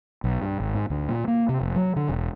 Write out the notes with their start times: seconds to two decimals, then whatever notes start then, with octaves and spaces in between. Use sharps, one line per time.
0.24 B1
0.41 G2
0.60 G#1
0.74 G#2
0.90 D2
1.09 A#2
1.28 A#3
1.49 C3
1.61 F1
1.76 F#3
1.96 D3
2.09 E1